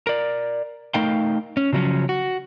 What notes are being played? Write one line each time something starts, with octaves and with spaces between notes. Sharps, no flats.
A#4 D5
A3 D#4 A#4 F5 G5
C#4
C#3 F3 F#3 A3 C#4
F#4